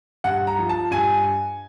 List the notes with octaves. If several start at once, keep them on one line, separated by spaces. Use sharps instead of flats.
G2 F#5
A#5
F3
A5
G2 G#5